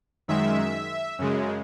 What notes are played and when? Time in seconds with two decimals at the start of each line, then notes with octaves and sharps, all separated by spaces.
0.28 F#2 D#3 G#3 E5
1.19 F#2 C#3 G#3